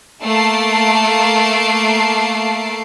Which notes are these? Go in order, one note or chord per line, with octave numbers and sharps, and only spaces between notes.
A3 A#3 A5 C7 D7